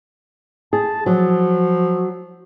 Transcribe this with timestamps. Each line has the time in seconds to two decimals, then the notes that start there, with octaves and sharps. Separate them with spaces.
0.73 G#4 A5
1.06 F3 F#3